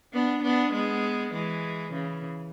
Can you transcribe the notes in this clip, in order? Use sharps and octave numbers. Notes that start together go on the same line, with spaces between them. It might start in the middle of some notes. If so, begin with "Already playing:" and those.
B3 D4
B3 D4
G#3 B3
E3 G#3
C#3 E3